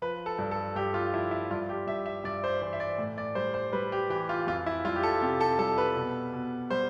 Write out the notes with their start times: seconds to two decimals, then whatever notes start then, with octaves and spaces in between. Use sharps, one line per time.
0.02 F3 B4
0.26 A4
0.39 G2
0.51 A4
0.75 G2 G4
0.94 F4
1.14 F3 E4
1.31 E4
1.51 G2 F4
1.69 G4
1.87 G2 E5
2.06 E5
2.24 G2 D5
2.44 C5
2.62 E3 C5
2.73 E5
2.80 D5
2.98 A2
3.18 D5
3.35 G3 C5
3.54 C5
3.72 G3 B4
3.92 G4
4.10 E3 G4
4.29 F4
4.47 F2 F4
4.66 E4
4.85 G3 F4
4.96 G4
5.03 A4
5.22 C3 G4
5.40 A4
5.59 G3 A4
5.78 B4
5.96 B2
6.33 B2
6.70 G3 C5